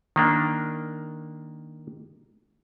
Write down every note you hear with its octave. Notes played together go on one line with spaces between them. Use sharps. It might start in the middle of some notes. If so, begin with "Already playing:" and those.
D#3 A#3 D4